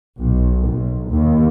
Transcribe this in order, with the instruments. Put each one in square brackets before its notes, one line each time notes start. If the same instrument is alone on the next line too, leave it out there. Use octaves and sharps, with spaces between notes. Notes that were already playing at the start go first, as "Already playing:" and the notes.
[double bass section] B1
B1
D#2